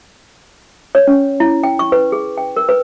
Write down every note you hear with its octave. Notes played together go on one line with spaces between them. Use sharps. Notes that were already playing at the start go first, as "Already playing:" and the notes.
C#5
C#4
E4
G5
C#6
B4
G#4
G5
A#4
B4